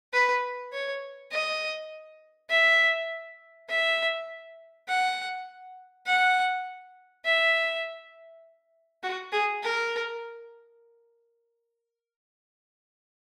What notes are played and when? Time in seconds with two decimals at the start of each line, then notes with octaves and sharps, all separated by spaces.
0.13 B4
0.72 C#5
1.32 D#5
2.50 E5
3.69 E5
4.88 F#5
6.06 F#5
7.25 E5
9.03 F#4
9.32 G#4
9.62 A#4